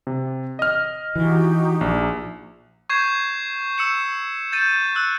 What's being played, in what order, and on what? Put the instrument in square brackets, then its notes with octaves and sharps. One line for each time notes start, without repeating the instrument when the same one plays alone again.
[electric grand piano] C3
D#5 F6
[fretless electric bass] E3 [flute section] D#4 F#4 G4
[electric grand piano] A#1
[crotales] C#6 G6 G#6 C7 E7
E6 C#7 E7
G6 A6 D#7
E6 F#6